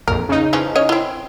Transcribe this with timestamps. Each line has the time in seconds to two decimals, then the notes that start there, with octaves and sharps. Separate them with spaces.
0.08 A#1 F2 A#4
0.29 C#3 D#4
0.53 E3 F3 C#4
0.76 C#4 C#5 D#5
0.89 C4 E4